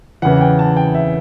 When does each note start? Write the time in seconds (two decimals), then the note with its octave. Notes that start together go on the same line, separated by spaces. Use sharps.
0.22 E2 C#3 E3 F#5
0.41 G5
0.59 A5
0.77 G5
0.95 E5